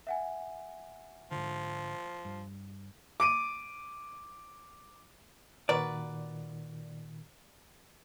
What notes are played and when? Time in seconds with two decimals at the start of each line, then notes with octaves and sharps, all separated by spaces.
0.07 E5 F#5 G#5
1.31 G#2 D3 F3
2.25 G2
3.20 D6 D7 D#7
5.69 A#2 D#3 F#4 A#4 B4 D5